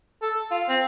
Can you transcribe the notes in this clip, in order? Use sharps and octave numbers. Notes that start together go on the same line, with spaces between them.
A4
F4
C4